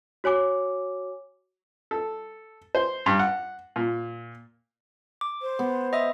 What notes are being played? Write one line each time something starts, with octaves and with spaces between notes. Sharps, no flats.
F#4 C#5 G#5 D6
A4
C5
G2
F#5
A#2
D6
C5
B3
D#5 E5 D#6